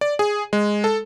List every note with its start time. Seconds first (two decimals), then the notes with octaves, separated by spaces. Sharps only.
0.01 D5
0.19 G#4
0.53 G#3
0.84 A4